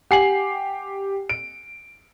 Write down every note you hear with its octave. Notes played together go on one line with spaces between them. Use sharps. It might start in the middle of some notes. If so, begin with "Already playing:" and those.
G4 F#5 G#5 C7 F#7
D7